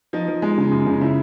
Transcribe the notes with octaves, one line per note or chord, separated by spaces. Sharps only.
F3 D#4
F3
G#3
C#3
F#2
C#3
C#3 E4